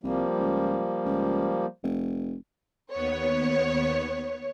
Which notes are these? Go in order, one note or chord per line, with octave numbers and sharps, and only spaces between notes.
C2 F3 G3 A#3
C#2
C#2
F1
D#2 B3 C#5